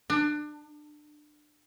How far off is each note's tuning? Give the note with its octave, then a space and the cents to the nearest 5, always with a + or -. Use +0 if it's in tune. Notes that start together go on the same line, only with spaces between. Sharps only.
D4 +25